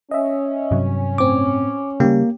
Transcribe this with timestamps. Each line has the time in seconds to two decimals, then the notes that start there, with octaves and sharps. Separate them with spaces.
0.11 C#4 D#5 E5
0.71 G2 C3 F#3
1.18 A2 C4 D6
2.00 C#3 G3 A#3 G4